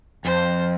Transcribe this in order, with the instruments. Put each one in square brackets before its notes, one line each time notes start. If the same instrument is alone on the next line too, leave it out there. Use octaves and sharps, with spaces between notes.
[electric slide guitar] F2 [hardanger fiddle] C5